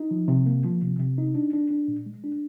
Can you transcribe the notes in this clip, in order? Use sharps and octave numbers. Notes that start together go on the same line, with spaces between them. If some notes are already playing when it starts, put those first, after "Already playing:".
Already playing: D#4
F3
C3
A#3
F3
C3
C3
D#4
D4
D4
D4
A#2
G#3
D4